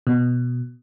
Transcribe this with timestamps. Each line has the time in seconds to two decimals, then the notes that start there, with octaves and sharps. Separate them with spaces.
0.07 B2